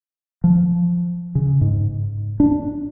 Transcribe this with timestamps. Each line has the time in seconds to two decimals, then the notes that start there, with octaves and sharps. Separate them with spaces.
0.44 F3
1.35 C#3
1.61 G#2
2.40 D4